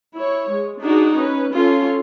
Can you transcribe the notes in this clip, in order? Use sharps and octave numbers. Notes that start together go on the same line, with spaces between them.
E4 C#5
G#3
D4 D#4 F#4 G#4
C#4 B4
C#4 F4 A4